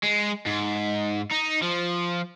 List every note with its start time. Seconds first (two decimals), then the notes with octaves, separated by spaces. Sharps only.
0.04 G#3
0.46 G#2
1.32 D#4
1.63 F3